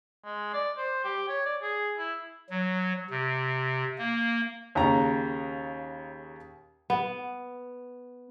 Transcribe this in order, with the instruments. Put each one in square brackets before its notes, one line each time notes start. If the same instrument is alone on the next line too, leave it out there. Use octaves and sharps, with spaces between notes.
[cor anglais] G#3
D5
C5
G4
C#5
D5
G#4
E4
[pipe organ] F#3
C3
A#3
[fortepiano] D#2 C#3 A#5
[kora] B3